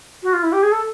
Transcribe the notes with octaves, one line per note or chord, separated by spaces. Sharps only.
F#4
F4
E4
G4
G#4
A4